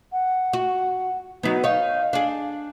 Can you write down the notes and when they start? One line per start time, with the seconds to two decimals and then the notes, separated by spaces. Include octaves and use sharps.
0.12 F#5
0.53 F#4
1.43 F#3 B3 D#4
1.64 D#4 C#5 F5
2.13 D4 G#4